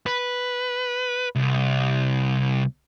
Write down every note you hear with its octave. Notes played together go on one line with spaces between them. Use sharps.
B4
C2